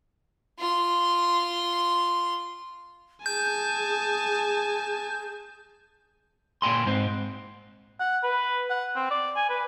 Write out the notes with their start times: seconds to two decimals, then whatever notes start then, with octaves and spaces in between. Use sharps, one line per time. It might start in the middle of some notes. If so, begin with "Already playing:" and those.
0.59 F4 C6
3.26 G#4 G#5 A5 G6
6.62 A#2 G5 G#5 C6
6.86 G#2 C4
8.00 F#5
8.23 B4
8.70 F#5
8.95 C4
9.11 D5
9.36 G#5
9.49 B4